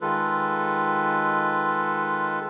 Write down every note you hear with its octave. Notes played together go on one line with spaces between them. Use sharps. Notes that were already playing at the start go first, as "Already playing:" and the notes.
D#3 G#3 F4 A4 B4